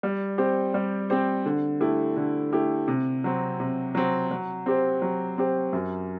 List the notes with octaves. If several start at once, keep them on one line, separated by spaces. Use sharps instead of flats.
G3
C4 G4 C5
G3
C4 G4 C5
D3
A3 E4 G4
D3
A3 E4 G4
C3
F#3 C4
C3
F#3 C4
F#3
C4 G4 C5
F#3
C4 G4 C5
F#2